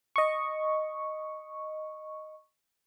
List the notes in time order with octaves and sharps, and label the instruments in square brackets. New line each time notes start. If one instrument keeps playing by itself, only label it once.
[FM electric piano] D#5 C#6